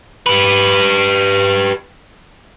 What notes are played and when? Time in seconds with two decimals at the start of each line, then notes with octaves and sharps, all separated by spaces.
0.27 G4 B4